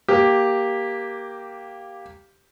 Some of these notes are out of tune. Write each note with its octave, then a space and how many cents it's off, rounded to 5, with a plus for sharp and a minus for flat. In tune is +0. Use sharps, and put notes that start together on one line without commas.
A#3 +0 G4 +0